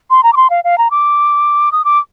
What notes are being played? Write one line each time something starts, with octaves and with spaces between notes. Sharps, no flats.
C6
A#5
D6
C6
F5
F5
A#5
D6
D#6
D6